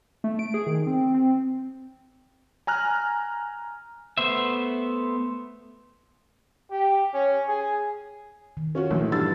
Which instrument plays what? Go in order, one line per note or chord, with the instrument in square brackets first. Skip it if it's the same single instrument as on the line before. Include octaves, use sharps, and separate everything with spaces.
[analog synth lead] A3
D7
G#4
D#3
C4
C4
[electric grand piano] G#5 A#5 F6 F#6
[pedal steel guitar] A3 B3 C5 E5
[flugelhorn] G4
C#4
G#4
[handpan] D#3
[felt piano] C#4 F4 F#4
[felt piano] A#1 [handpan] E3 A3
[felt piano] G2 E6 A6